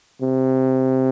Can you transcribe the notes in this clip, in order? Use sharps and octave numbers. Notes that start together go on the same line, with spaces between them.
C3